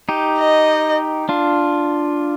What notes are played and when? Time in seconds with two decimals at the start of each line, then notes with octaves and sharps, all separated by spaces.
0.09 D#4 G4
0.38 D#5
1.29 D4 F4